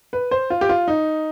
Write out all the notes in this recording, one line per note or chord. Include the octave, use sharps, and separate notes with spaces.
B4
C5
F4
G4
F4
D#4